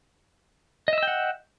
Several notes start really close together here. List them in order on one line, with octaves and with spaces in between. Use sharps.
D#5 E5 E6 G5 F#5